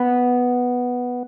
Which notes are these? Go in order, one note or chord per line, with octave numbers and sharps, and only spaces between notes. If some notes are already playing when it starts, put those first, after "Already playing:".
Already playing: B3